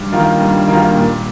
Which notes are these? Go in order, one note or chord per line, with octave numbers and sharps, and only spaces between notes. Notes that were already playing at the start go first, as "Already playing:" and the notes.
Already playing: G2
D#3 A#3 F4
G2
D#3 A#3 F4
A#2